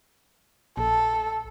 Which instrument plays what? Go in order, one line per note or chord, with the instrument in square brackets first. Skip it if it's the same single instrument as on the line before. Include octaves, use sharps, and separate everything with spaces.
[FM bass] A#1 [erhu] A4